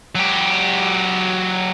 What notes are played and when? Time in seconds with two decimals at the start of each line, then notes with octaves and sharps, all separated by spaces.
0.15 F#3 G4